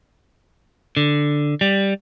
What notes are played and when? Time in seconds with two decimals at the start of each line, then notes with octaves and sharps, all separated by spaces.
0.97 D3
1.61 G3